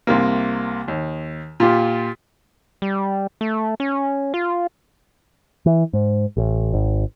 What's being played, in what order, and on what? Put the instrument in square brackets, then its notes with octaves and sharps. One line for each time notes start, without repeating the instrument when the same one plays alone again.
[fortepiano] C2 C3 A#3
D#2
A#2 F4 G4
[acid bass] G3
A3
C#4
F4
[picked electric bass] E3
G#2
A1
G#1